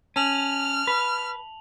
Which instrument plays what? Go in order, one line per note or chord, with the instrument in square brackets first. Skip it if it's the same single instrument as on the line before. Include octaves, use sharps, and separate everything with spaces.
[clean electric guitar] C#4 [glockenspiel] A5 F7 F#7 [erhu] F6
[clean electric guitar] B4